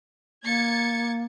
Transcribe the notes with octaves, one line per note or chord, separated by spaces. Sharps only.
A#3 G#6 A6 C#7